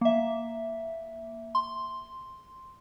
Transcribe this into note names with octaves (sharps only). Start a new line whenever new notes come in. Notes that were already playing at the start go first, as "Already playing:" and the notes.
A#3 E5
C6